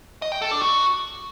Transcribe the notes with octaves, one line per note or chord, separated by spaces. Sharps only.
D#5
G5
A4
D4
F#4